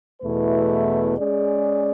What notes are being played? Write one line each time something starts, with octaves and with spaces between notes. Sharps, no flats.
E2 B2 A3 E4 B4
G#3 C#4 G#4 D5